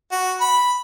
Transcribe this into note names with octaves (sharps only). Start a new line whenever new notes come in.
F#4
B5